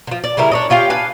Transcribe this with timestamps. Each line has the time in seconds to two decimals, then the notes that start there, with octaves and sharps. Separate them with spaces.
0.07 D3 F3
0.24 D5
0.37 C#3 G3 E4 A#4
0.51 D4 C#5 D#5
0.70 C#4 F4 G4 F5
0.90 D4 B4 F5 G#5